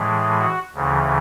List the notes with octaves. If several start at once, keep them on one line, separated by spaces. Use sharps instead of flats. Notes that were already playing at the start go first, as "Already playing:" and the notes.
Already playing: A2 E3 G#3
F#4
D2 C#3 E3